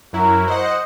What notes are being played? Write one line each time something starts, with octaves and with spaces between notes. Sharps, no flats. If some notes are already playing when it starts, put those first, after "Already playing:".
F#2 F#3 E4 F#4 A#4
C5 D#5 F#5